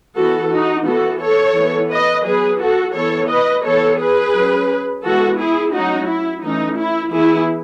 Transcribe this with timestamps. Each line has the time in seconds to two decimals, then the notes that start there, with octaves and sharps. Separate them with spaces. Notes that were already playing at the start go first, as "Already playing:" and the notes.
0.15 E3 B3 F#4 A4
0.50 D#4 F#4
0.85 E3 B3 F#4 A4
1.20 A4 C#5
1.56 E3 B3
1.90 B4 D#5
2.25 F#3 B3 G#4 B4
2.59 F#4 A4
2.94 E3 B3 A4 C#5
3.29 B4 D#5
3.64 E3 B3 A4 C#5
3.99 G#4 B4
4.34 F#3 C#4
5.03 E3 G#3 B3 F#4 A4
5.39 E4 G#4
5.73 F#3 A3 C#4 D#4 F#4
6.08 E4
6.43 E3 A3 C#4 D#4
6.78 E4
7.12 E3 B3 E4 G#4